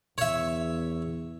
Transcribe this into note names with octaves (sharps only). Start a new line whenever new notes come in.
E2 C#5 E5